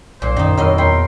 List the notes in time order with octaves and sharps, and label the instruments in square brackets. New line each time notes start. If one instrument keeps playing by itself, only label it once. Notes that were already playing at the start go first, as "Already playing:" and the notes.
[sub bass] B1 [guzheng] A#2 [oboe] C5
[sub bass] F#2 [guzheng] D#3 D#4
[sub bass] F2 [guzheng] D#3 D#5 C6 [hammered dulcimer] F#3 E4 A#4
[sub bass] E2 [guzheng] E4 [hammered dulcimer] G5 [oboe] C6